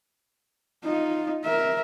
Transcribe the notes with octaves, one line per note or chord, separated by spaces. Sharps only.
D#4 F4
A#4 E5